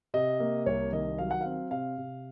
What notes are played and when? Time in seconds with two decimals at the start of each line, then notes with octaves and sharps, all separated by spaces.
0.14 C3 D#5
0.40 A#3
0.66 C2 C#5
0.93 D#3 D#5
1.18 F#3 F5
1.31 F#5
1.41 C4 F5
1.71 C3 F5
1.98 C3